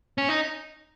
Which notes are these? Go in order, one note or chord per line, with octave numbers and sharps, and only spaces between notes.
C#4
D#4